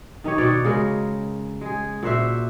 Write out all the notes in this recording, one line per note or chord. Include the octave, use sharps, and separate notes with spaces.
D#3 D#4 G4 C#5
B2 C#5 D5
C#3 G#3 A#4
G#3 G#4
A#2 F#4 C5 E5